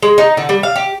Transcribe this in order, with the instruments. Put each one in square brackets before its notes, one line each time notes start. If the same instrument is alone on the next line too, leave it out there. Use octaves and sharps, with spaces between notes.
[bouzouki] G#3
D#4
D3
G3
F5
G4